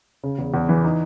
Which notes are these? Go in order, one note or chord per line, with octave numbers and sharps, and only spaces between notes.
C#3
E2
E2
E3
D#4